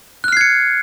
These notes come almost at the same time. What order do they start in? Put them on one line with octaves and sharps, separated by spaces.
F#6 F6 C7 G#6 C#7